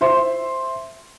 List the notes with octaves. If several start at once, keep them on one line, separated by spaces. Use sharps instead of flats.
C5 E5 C6